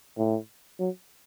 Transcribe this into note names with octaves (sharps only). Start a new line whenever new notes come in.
A2
F#3